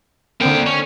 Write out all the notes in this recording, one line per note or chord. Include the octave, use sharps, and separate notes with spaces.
D3 A#3 C4 A#4 G5
C#4